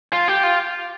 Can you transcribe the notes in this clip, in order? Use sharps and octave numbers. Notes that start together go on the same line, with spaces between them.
F4
G4
F4